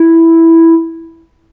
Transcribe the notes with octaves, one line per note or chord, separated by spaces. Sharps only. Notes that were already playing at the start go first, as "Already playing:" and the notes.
Already playing: E4